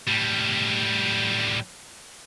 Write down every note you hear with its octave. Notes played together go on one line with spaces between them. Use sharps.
A2 G3